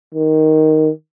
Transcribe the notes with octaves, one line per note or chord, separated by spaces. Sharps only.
D#3